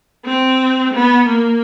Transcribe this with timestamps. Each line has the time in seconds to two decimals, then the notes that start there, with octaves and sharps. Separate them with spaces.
0.25 C4
0.93 B3
1.27 A#3